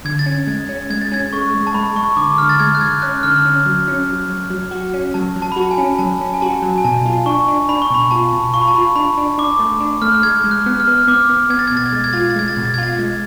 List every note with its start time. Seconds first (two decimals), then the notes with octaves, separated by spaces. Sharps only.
0.05 D3 G#6
0.19 A6
0.26 C#4
0.32 G#6
0.47 G#3 G#6
0.69 C#4
0.90 G#3 G#6
1.02 A6
1.12 C#4 G#6
1.33 G#3 C#6
1.54 G#3
1.67 A5
1.74 G#3 B5
1.96 G#3 C#6
2.17 D3 D6
2.38 D3 F6
2.49 A6
2.60 G#3 G#6
2.75 F#6
2.81 D3 G#6
3.02 C#4 F#6
3.23 D3 F6
3.45 C#4
3.66 F#3
3.88 C#4
4.09 F#3
4.30 F#3
4.50 F#3
4.71 F#4
4.94 C#4
5.14 F#3 A5
5.36 F#3
5.42 A5
5.52 B5
5.56 F#4
5.61 A5
5.71 G#5
5.78 C#4
5.99 F#3 A5
6.21 C#4
6.34 G#5
6.41 F#4 A5
6.62 F#3
6.78 G#5
6.84 B2 A5
7.06 F4
7.26 D4 C#6
7.48 D4
7.69 D4 B5
7.82 C#6
7.90 B2 B5
8.11 F4 A5
8.33 B2
8.54 F4 C#6
8.61 B5
8.68 A5
8.74 F4 B5
8.96 D4 B5
9.18 D4
9.38 D4 D6
9.59 A3
9.80 D4
10.02 A3 F6
10.12 F#6
10.23 G#3 G#6
10.44 G#3
10.51 F#6
10.66 B3
10.80 F6
10.87 B3 F#6
10.98 F6
11.07 B3 D6
11.29 B3
11.50 B3 G#6
11.59 A6
11.68 G#6
11.72 B2
11.77 A6
11.86 G#6
11.92 G#3 A6
12.04 G#6
12.13 F4 A6
12.21 G#6
12.31 A6
12.36 G#3 G#6
12.48 A6
12.56 B2 G#6
12.66 A6
12.74 G#6
12.78 F4 A6
12.92 G#6
12.99 G#3